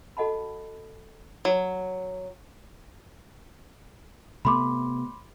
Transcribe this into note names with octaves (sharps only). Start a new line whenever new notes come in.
F#4 A4 D#5 F#5 A5 B5
F#3
C3 A3 B3 B5 C6 D6